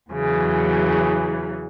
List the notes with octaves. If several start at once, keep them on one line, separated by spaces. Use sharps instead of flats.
E2 C#3 E3 F#3